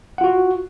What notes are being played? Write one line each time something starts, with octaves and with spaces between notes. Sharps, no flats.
F4 F#4 F#5